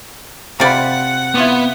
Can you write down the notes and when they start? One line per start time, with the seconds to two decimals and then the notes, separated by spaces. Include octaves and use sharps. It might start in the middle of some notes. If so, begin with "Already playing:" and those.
0.60 C3 F4 D5 F#5 G5 B5
1.35 B3 E4 F4 G4